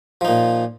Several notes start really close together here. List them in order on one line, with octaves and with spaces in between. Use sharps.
F3 D#4 A#2